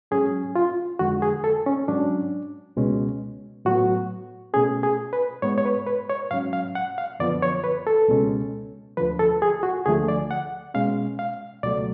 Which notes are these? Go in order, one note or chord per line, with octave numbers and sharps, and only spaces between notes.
G#2 F#3 C#4 G#4
F4
F2 D3 G#3 F#4
G#4
A4
C#4
G#2 F#3 C#4 D4
C#2 B2 G#3 C#4
A2 F#3 B3 F#4
B2 A3 C#4 G#4
G#4
B4
G#2 G#3 B3 C#5
C#5
B4
B4
C#5
G#2 F#3 C#4 F5
F5
F#5
F5
F#2 D3 F3 B3 D5
C#5
B4
A4
C#2 B2 G#3 C#4
D2 D3 F3 B4
A4
G#4
F#4
D2 D3 F3 A3 G#4
D5
F#5
B2 G#3 C#4 F5
F5
C#2 B2 F#3 A3 D5